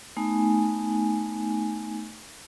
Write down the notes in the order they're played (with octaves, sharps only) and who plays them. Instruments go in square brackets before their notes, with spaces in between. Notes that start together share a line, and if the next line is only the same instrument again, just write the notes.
[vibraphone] A3 B3 D#4 G#5